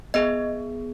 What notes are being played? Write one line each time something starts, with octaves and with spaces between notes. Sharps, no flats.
B3 G#4 D#5